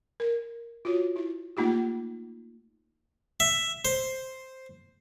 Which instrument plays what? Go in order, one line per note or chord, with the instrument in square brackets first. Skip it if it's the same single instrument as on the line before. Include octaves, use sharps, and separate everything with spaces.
[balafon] A#4
F4 F#4 C#5
E4
A3 A#3 D#4 F4 G4
[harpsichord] E5
C5